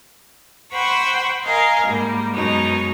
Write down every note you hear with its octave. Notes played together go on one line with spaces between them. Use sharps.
C5 F#5 G5 B5 C#6
A#4 D#5 F5 G#5
G#2 G3 A#3
F#2 B2 G#3 D#4 C#5